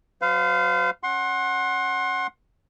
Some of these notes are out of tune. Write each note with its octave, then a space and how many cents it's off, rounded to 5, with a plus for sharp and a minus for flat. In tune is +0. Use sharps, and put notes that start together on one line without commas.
F#3 +5 C5 -45 F5 +0
C#4 +0 F#5 +0 C6 +30